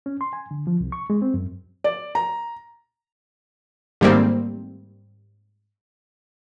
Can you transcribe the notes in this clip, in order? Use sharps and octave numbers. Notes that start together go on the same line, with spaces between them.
C#4
C6
G#5
D3
F3
C2
C#6
G#3
C4
F#2
D5
A#5
G#2 D#3 G3 A3 A#3 C4